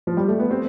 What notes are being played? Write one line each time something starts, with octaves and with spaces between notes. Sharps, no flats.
F3
G3
A3
B3
C4